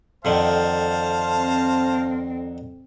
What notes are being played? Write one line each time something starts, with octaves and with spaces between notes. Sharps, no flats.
F2 D3 D#3 C5 F5 A5
C4